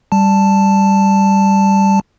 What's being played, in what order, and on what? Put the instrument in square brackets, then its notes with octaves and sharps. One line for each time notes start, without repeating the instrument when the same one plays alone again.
[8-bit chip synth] G3 A5